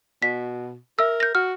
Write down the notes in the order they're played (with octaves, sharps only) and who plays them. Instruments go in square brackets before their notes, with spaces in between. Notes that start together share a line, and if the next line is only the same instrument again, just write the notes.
[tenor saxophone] B2 [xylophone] B6
[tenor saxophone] A#4 [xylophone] E5 E6
[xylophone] G6 A#6
[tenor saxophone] F#4 [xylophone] F6